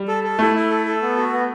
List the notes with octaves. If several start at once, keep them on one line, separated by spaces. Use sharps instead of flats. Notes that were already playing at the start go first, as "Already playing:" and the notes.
Already playing: G3
A4
A4
A3 E4
E4
A4
A4
B3
F#4
B3